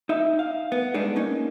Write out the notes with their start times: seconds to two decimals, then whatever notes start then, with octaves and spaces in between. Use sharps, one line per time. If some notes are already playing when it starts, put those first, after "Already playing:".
0.09 D#4 E5
0.39 F5
0.72 B3
0.94 G3 G#3 B3 D4 D#4 G#4
1.16 A#3 C#4 D#4